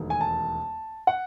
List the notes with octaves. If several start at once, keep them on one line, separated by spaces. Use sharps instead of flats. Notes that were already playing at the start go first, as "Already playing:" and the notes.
Already playing: E1 D#2 D#3 A3
G#5
A5
F#5